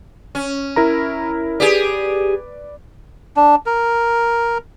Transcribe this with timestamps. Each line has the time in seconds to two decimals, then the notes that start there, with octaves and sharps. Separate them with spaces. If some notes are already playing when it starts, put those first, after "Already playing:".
0.35 C#4
0.76 E4 A#4 A#5
1.60 G4 G#4 B4 D5
3.37 D4
3.66 A#4